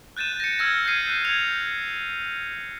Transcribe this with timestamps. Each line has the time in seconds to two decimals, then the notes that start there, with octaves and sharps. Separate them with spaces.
0.17 F#6 G6 A6 D#7 E7
0.40 A#6 C#7
0.59 E6 F6 G#6 A#6
0.85 G6 G#6 A#6 C7 D#7
1.09 F#6
1.25 G6 G#6 C#7 F7